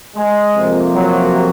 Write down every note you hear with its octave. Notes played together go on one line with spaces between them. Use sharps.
G#3
F2 C3 F3 A#3
F#3